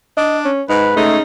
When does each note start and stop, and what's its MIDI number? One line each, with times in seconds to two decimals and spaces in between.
0.17 0.49 62
0.17 0.39 75
0.45 0.62 61
0.69 0.92 44
0.69 0.90 63
0.69 1.02 71
0.96 1.21 49
0.96 1.19 56
0.96 1.16 57
0.96 1.21 63